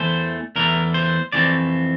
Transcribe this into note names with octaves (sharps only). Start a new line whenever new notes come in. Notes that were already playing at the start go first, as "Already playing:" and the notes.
Already playing: E2 E3 A3 C5
E2 E3 A3 A#4
C5
F2 E3 A3 C4 D5